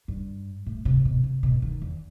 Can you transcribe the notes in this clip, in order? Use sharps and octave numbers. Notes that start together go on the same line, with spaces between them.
G2
A2
C3
B2
C3
B2
D#3
E2